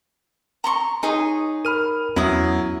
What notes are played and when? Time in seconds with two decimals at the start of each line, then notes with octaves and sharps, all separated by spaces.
0.64 A#5 C6 C#6
1.03 D#4 G#4 C#5
1.65 A#4 B5 F6 D#7
2.16 E2 F#3 B3 C#4 E4 D#6